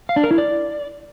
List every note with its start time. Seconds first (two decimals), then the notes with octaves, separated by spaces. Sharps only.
0.09 F5
0.16 D4
0.24 A#4
0.31 E4
0.38 D5